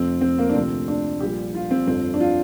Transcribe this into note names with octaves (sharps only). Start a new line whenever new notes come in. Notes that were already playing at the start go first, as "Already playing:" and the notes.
Already playing: F1 F2 F3 C4
C4
A#3
D4
D2 C3 F3 C4
D4
A#1 A#2 G3 G4
F4
C4
G1 F2 F3 C4
D4
F4